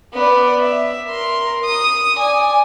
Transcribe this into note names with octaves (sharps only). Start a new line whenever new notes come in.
B3 D5
E5
A#4 C6
D#6
D5 G#5